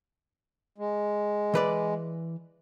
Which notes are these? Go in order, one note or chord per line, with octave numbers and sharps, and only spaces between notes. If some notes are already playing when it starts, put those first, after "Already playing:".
G#3
E3 B4 D5